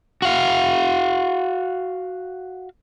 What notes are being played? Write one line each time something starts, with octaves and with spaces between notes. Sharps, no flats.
F#4 F5